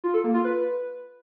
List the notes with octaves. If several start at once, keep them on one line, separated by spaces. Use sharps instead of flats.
F4
A4
A#3
F4
B4